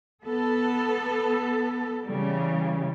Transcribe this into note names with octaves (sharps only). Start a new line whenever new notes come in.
B3 A4
C#3 E3 G3